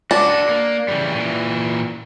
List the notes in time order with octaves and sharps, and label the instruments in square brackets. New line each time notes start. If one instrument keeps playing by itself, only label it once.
[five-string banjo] D4 [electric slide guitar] F#4 A4
[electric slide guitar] A#3
C#3 E3 G3
A#2 E3